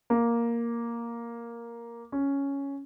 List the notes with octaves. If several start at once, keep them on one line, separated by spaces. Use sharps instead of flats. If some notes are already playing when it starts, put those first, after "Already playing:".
A#3
C#4